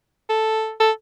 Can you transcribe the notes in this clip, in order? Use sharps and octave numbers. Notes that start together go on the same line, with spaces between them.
A4
A4